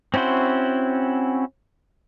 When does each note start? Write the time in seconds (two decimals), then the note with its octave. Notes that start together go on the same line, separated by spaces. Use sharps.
0.14 C4 C#4 E4 F#4 C5